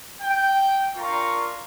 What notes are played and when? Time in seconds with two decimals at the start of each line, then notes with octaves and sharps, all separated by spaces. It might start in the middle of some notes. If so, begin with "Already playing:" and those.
0.21 G5
0.96 D4 F4 A#4 A#5 C#6